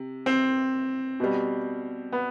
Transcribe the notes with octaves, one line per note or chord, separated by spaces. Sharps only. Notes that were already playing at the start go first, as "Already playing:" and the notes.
Already playing: C3
C4
B2 G3
B3